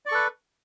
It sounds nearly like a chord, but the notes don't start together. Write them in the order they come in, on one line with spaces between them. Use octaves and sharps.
D5 C#6 A4 B4